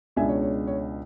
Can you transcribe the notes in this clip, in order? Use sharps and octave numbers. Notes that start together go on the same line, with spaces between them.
C#2 B2 G#3 D4 E5 G#5
C#5
C#5
C#5